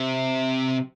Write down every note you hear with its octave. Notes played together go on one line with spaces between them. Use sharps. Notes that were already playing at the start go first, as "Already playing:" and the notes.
Already playing: C3